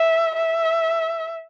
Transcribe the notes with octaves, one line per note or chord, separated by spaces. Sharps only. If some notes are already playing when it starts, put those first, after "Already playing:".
Already playing: E5
E5